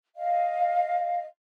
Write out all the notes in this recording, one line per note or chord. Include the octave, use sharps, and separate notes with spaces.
D#5 F5